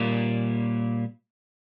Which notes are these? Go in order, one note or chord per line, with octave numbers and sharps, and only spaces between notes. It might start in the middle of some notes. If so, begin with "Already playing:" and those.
Already playing: A#2 G3 A#3